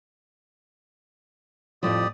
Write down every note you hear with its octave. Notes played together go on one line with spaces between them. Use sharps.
F2 A2 F3 G4 D5 D#6